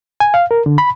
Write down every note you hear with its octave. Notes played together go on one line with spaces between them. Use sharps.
G#5
F5
A#4
D3
B5